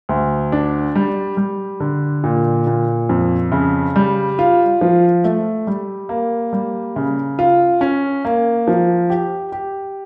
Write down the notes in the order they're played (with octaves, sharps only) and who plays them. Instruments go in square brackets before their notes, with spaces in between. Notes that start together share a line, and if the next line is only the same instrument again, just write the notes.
[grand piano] D2
D4
G3
G3
D3
A#2
A#2
F2
C#3
G3
F4
F3
A3
G3
A#3
G3
C#3
F4
C#4
A#3
F3
G4
G4